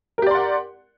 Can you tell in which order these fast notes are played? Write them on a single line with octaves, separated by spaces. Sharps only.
A#4 G4 D5 C6 F#5